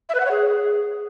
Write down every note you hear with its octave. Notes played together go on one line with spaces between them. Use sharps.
E5
B4
F#5
C#5
G#4